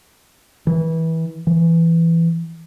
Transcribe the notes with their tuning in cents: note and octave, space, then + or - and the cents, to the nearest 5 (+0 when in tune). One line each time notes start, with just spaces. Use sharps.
E3 -25
E3 +15